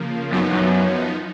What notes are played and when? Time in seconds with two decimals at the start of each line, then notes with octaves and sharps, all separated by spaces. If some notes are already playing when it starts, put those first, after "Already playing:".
Already playing: C#3 F3 A#3
0.32 F#2 F3 B3 D#4
0.53 F#2